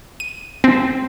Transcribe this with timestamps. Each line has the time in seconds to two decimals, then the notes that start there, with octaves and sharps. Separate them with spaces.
0.20 D#7
0.64 C4